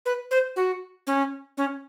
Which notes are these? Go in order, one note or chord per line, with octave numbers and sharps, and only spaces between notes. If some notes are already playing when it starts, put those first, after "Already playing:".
B4
C5
F#4
C#4
C#4